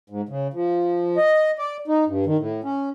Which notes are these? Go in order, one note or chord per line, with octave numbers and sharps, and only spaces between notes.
G#2
C#3
F3
D#5
D5
D#4
G2
D#3
A2
C#4